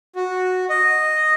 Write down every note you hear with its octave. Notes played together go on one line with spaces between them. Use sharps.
F#4
D#5